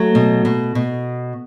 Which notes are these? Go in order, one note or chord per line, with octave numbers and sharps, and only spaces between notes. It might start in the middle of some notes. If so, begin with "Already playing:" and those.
Already playing: F#3 A3
B2
B2
B2